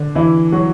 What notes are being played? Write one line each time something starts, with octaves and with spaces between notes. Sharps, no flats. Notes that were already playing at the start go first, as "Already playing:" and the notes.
Already playing: D3 D4
E3 E4
F#3 F#4